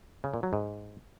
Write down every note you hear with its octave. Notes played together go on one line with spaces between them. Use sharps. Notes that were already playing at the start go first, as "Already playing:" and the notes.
C#3
A#2
F#3
G#2